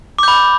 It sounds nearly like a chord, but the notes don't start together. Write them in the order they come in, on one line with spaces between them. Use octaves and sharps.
D6 G6 B5